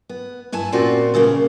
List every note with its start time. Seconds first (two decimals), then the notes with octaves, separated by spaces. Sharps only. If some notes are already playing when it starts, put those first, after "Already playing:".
0.09 B3
0.52 G2 E4 G#5 A5
0.72 A#2 C4 C#4 F4 F#4 D5
1.14 A#2 C#3 G3 A#3 B3